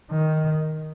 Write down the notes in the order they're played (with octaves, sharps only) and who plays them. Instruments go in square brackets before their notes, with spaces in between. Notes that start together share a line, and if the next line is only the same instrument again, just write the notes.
[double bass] D#3